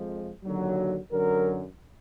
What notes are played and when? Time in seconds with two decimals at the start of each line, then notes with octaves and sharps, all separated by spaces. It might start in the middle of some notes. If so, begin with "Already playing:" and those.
Already playing: F2 F3 G#3
0.45 D#2 D3 F#3
1.12 F#2 D3 F#3 A#4